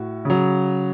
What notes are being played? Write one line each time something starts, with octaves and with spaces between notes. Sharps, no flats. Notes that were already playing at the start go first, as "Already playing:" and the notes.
Already playing: A2 F#4
C#3 F#3